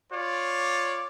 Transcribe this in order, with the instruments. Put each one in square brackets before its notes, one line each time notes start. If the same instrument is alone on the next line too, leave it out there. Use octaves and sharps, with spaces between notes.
[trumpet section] F4 C#5 D5